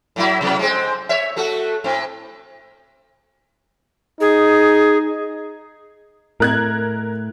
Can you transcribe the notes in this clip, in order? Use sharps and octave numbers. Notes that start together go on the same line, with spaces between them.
A2 F#3 E4
C3 F#3 B3
G#3 C4
C#5 E5
A3 F#4 A4
A2 C4
D#4 G#4
A2 A#4 F#6 G#6